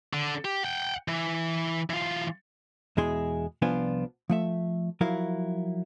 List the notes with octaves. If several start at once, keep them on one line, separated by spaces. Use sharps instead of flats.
D3
G4
F#5 G5
E3
E3 F4
E2 B2 G#3 E4 G#4 C6
C2 F3 B3 D4 F4 G#5
F3 A3 E5
F3 F#3 E4 A#4 F5